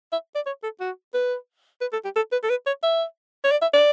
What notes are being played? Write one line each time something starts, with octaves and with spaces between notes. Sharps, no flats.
E5
D5
C#5
A4
F#4
B4
B4
A4
G4
A4
B4
A4
B4
C#5
E5
C#5
D5
E5
D5